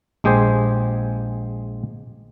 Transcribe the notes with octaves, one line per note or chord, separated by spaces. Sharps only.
A#1 G#3 G4 G#4 C5